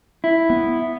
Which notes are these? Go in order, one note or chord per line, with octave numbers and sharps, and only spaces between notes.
E4
B3